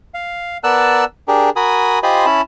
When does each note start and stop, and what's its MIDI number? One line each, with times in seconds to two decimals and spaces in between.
0.14 0.57 77
0.64 1.05 59
0.64 1.05 70
0.64 1.05 74
0.64 1.05 81
0.64 1.05 88
0.64 1.05 90
1.28 1.50 62
1.28 1.50 67
1.28 1.50 68
1.28 1.50 70
1.56 1.99 66
1.56 1.99 70
1.56 1.99 80
1.56 1.99 83
1.56 1.99 87
2.03 2.26 65
2.03 2.26 67
2.03 2.26 72
2.03 2.26 75
2.03 2.26 80
2.03 2.26 83
2.26 2.41 61
2.26 2.41 64
2.26 2.41 81
2.26 2.41 83